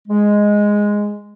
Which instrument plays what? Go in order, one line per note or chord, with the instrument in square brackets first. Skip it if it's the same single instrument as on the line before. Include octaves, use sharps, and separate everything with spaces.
[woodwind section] G#3